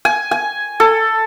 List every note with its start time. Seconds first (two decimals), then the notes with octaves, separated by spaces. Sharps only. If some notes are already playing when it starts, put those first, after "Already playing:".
0.05 G#5
0.31 G#5
0.80 A4